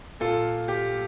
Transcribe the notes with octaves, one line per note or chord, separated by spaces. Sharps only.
A#2 F4 A4
G4